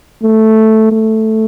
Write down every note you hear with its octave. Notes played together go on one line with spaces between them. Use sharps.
A3
A3